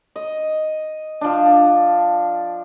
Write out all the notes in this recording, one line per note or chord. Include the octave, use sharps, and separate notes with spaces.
D#5
F3 D4